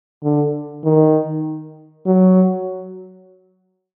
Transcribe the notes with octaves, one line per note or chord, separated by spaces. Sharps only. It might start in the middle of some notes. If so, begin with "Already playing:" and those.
D3
D#3
F#3